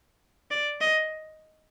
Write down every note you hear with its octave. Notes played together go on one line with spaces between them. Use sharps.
D5
D#5